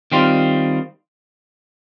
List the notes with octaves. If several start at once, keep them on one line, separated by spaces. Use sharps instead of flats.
D#3 G3 C4 F4